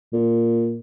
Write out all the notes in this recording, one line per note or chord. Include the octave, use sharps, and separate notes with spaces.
A#2